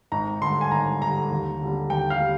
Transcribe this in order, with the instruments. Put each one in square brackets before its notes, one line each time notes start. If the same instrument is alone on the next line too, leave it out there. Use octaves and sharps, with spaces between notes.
[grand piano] G#1 A#5
G2 D3 C6
G#5
G#1 A#5
G2 D3 A#5
D#2
D3 G3
D#2 G5
F5
G3